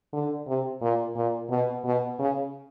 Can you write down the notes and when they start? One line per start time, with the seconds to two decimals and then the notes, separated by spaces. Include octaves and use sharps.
0.13 D3
0.47 C3
0.82 A#2
1.16 A#2
1.50 B2
1.85 B2
2.19 C#3